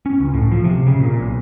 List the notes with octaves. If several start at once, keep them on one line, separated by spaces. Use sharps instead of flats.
C#4
C#2
A2
F3
C3
C#3
A#2
B1